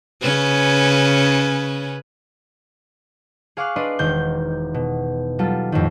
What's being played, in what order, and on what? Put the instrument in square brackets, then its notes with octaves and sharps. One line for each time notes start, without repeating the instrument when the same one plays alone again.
[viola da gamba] C#3 C#4 B4
[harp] G#4 F5 C#6 D6 F6 F#6
D4 B4 D5 D#5 C6
E1 D#3 G6
B2
F#3 G3 F4 A4
F2 A2 D#3